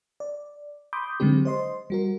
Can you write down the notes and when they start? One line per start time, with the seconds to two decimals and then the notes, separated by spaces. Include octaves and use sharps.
0.20 D5
0.93 B5 C6 D6 D#6 G6
1.20 D3 F#3 G#3 C4 G4
1.45 C5 D#5 C6
1.90 G3 F#4 A#4